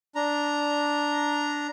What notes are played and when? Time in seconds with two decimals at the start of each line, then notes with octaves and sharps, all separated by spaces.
0.15 D4 A#5